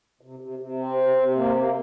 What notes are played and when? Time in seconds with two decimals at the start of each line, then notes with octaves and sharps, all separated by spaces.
0.21 C3
0.39 C3
0.59 C3
0.79 C4
0.97 C3
1.16 C3
1.36 A#3
1.55 A#3